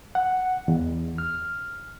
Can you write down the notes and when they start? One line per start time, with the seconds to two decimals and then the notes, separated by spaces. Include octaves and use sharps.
0.15 F#5
0.68 E2
1.18 F6